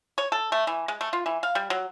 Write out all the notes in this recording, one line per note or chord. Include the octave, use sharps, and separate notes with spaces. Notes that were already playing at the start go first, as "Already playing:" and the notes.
C#5
A4
A3
E3
G#3
A3
F4
E3
F5
G3
F#3